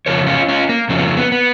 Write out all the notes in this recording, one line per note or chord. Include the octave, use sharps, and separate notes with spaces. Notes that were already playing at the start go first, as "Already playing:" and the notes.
F2 C#3 F3 A#4 C#5
C#4 F4
C#4 F4
A#3
F2 C#3 F3 C#4
B3
A#3
B3
B3